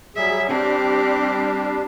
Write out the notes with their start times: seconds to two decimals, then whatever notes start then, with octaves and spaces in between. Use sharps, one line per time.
0.16 F#3 G3 G#4 E5
0.49 G3 C4 D4 G4